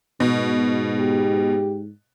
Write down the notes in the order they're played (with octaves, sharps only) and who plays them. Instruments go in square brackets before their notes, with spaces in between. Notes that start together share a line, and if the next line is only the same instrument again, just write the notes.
[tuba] G#2 [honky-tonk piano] B2
[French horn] G4